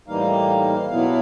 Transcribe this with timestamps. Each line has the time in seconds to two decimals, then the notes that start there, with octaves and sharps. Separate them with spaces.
0.08 A2 E3 G3 A#3 D#4 F5
0.91 B2 F#3 B3 E4